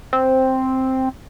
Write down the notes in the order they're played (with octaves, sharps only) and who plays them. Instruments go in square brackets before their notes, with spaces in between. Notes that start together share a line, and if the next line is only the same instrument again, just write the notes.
[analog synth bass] C4